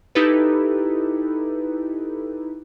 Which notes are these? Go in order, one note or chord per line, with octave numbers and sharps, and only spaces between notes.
D#4 E4 G4 A4 B4